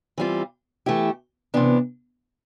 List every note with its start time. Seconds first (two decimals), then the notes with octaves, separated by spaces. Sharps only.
0.18 E3 G3 C4 F4
0.86 E3 A3 E4 G4
1.54 C3 E3 B3 D4